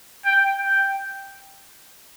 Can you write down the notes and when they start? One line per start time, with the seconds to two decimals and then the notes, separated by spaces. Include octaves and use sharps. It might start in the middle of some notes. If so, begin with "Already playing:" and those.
0.25 G5
0.60 G5